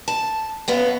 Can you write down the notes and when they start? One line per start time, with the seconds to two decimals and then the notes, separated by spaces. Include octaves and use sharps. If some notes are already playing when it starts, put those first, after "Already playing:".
0.08 A5
0.68 F#2 B3 F5